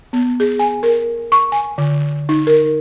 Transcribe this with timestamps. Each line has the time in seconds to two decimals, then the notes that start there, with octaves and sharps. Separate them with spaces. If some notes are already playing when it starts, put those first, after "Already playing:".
0.13 B3
0.40 G#4
0.59 G#5
0.83 A#4
1.32 C#6
1.52 G#5
1.78 D3
2.29 D#4
2.47 A#4